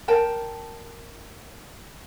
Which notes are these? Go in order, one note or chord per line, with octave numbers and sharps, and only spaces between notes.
A#4 G5 A5